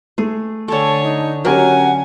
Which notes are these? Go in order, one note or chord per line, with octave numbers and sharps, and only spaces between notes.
A3 G#4
D3 A4 C#5 G#5 A5
D#4
F#3 C#4 G4 A#4 F#5 G#5